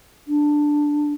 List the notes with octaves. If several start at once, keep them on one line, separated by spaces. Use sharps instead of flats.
D4